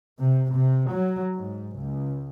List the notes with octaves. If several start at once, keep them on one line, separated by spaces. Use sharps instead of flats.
C3
C3
F#3
G#2
C#2